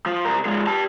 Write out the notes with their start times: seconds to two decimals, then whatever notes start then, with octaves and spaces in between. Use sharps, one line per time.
0.06 F3
0.25 C2 A#4
0.46 F3 G#3
0.67 G4 A5